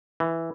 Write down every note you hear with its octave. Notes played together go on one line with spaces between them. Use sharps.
E3